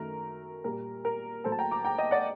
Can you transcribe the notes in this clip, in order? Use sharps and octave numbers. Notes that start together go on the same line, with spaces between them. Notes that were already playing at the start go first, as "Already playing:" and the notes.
Already playing: F#2 D#3 A3 A#4
A#2 G3 A#3 A#4
A#4
A2 F#3 A#3 A4 C5
A5
G5 A#5
A#5 D6
G5 A#5
D#5 G5
D5 F#5